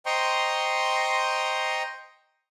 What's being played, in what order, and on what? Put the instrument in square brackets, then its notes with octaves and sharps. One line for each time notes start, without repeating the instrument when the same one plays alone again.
[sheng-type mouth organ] C5 D#5 G5 A#5 C6 C#6